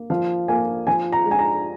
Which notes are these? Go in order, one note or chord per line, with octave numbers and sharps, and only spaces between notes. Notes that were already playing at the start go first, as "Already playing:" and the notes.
Already playing: A#3
F3 F5
A#3 G#5
F3 G#5
A#5
G#3
G#5
A#5